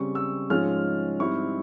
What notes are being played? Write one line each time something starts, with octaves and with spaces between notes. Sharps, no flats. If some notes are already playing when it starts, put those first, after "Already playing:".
Already playing: C#3 G3 C4 C#6
E6
G#2 F3 G#3 C#4 F4 F6
G#2 G3 C4 E4 C#6